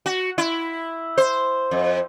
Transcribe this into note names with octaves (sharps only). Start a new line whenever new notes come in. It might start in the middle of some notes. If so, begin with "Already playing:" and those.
F#4
E4
C5
F2